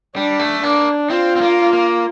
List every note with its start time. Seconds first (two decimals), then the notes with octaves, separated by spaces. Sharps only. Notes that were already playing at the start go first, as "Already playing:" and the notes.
0.16 G3 D4
0.39 A3
0.63 A#3 D4
1.10 C4 F4
1.36 C4
1.41 A#3
1.73 A#3